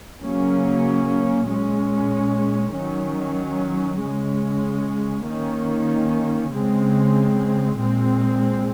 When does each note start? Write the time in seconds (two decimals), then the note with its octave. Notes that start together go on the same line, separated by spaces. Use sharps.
0.21 C#3 F#3 A#3 C#4
1.48 A#2 G#3 C#4
2.74 D#3 F#3 C#4
4.00 C#3 G#3 C#4
5.26 D#3 A#3 C#4
6.52 C#3 G#3 C4
7.78 A#2 G#3 C4